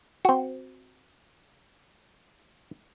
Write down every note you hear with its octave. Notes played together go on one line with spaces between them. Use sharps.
C4 F#4